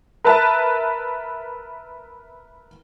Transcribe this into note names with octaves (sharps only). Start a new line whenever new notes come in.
A#4 B4 E5 A5